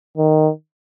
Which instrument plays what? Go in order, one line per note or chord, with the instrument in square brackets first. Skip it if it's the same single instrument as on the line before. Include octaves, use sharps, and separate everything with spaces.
[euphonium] D#3